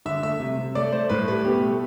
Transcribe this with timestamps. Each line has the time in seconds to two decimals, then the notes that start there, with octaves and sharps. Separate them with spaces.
0.06 D3 E5
0.22 A3 E5
0.40 C3
0.58 C3
0.75 A3 D5
0.92 A3 C5
1.10 A2 B4
1.28 G3 B4
1.45 B2 G4
1.62 A3